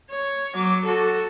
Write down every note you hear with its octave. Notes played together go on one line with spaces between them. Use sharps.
C#5
F#3 D6
F#4 A4